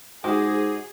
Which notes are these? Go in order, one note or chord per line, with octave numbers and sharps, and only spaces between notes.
G#2 F#4 G#4 C5 D#5 D6